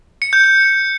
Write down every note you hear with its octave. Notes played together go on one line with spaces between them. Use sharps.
C#7
G6
G6